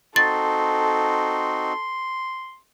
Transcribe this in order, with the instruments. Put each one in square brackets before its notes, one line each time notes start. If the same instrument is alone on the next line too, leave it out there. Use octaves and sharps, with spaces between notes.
[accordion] C4 D#4 F#4 [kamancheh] A4 [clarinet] C6 [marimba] A6